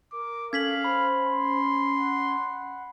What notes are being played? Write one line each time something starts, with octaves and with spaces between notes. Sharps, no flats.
A#4 D6
C#4 A4 F5 G#6 B6 F#7
C5 B5
C6
F#5